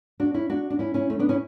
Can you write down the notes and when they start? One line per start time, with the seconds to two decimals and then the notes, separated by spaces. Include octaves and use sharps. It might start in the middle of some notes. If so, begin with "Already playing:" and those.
0.20 D4 F#4
0.34 C#4 E4
0.50 D4 F#4
0.70 D4
0.79 C#4 E4
0.94 C#4 E4
1.10 A3 C#4
1.19 B3 D4
1.29 C#4 E4